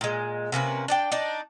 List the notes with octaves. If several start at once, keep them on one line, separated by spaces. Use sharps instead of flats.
A#2 G#3
C3 A#3 C#4 B4
D4 D5 G5
D4 D#4 D5